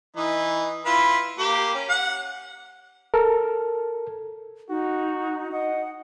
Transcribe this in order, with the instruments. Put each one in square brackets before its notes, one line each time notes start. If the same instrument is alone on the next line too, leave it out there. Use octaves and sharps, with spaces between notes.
[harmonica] E3 D#4
E4 F4 B4
A#3 G4
C#4
F#5
[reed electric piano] A4 A#4
[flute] D#4 [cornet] F#4
[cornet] D#5 [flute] F#5